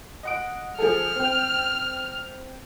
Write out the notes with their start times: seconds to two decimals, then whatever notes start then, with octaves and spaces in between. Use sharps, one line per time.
0.23 D#5 F#5 D7
0.78 F3 G#4 A4 F6
1.16 C4 G5